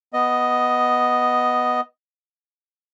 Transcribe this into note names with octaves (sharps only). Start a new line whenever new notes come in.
B3 D#5